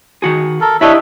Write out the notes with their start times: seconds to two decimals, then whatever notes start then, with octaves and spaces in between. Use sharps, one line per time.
0.22 D#3 F#4 G#4
0.61 A4 A#4
0.81 D4 E4 G4 C#5 D#5 E5